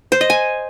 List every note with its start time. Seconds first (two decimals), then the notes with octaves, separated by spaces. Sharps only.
0.12 C5
0.21 D#5
0.30 G#5